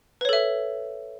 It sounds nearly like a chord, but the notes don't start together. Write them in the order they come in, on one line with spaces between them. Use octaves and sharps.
B4 C#5 A4 E5